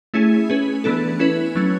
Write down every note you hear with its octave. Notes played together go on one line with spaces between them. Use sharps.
A3 C#4 E4 G#4
C#4 G#4 B4
E3 B3 D4 A4
C#4 E4 B4
F#3 A3 C#4